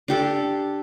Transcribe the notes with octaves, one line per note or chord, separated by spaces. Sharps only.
D4 G4 A4